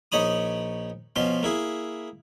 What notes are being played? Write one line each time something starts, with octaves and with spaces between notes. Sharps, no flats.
A#1 D#4 C#5 B5 D#6
B2 F3 C#4 C6
A#3 E4 G#4